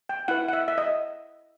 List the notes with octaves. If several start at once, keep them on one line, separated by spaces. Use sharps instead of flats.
G5
E4 B4 F#5
F#5
E5
E5
D#5